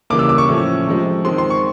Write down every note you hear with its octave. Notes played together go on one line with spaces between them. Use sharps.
C#3 E3 G3 A#3 D6
E6
D6
C#6
A2 F3 A3 C#4
C3 F3 G#3
D#3 G#3 C4 C6
C6
C#6